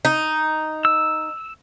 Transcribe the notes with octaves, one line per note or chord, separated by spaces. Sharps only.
D#4
E6